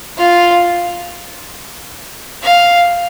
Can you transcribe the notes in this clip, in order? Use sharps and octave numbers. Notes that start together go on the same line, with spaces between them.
F4
F5